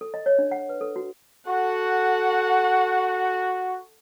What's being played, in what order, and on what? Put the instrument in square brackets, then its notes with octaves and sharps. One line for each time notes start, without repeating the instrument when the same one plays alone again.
[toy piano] A4
D#5
C#5
D4
F#5
B4
A4
F#4
[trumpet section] F#4 [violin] A4 F#5